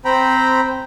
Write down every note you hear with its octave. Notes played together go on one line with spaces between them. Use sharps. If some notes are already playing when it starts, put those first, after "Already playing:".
C4 C5 G5 A#5 B5